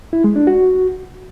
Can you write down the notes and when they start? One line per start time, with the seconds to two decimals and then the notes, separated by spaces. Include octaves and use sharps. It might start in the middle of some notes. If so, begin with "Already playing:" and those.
0.13 E4
0.24 G#3
0.36 D4
0.47 F#4